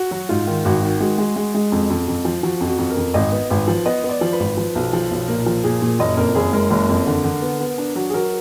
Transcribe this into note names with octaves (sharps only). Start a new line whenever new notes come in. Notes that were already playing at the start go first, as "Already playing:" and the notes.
Already playing: F#4
F#3
G#2 F4
D#3
G#1 F#4
D#3
G#3 F#4
G#3
G#3
G#3
F2
F2
F2
F3
F3 F#4
F2
F#4
F2
A#4
F2
G#1 D#5
B3
G#1 B4
F3
B3 D#5
B3
D5
F3
B4
G#1
F3
B1
F3
B1
A#2 A#4
F3
A#2 G#4
A#2
F#1 D#5
F2 A#4
F#1 G#4
G#3 A#4
F#1 A#4
F2
D3
D3
B3
B3
D4
F#3
G#4
F#3 A#4